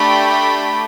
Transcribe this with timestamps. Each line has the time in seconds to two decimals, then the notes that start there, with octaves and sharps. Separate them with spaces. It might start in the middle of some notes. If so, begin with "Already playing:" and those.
Already playing: A3 D4 G4 G5 B5